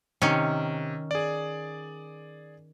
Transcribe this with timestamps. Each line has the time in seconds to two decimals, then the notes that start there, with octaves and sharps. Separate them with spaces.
0.22 C3 D#3 C#4
1.11 G#4 D5